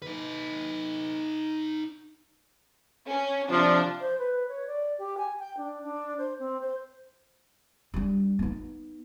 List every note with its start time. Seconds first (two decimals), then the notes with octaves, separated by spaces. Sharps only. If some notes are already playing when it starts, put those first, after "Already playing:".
0.02 D#4 B4
3.09 C#4
3.49 C3 F3 D4
4.01 C5
4.18 B4
4.48 C#5
4.67 D5
4.98 G4
5.18 G#5
5.39 G5
5.57 D4
5.83 D4
6.18 C5
6.39 C4
6.61 C5
7.94 G3 D4
8.39 B3 D#4